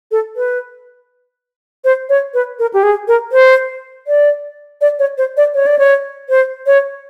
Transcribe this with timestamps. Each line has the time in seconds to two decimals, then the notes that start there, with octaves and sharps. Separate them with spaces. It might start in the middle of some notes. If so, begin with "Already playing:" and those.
0.11 A4
0.36 B4
1.84 C5
2.09 C#5
2.34 B4
2.59 A#4
2.74 G4
2.83 G#4
3.08 A#4
3.32 C5
4.07 D5
4.81 D5
4.99 C#5
5.18 C5
5.37 D5
5.54 C#5
5.66 D5
5.79 C#5
6.29 C5
6.67 C#5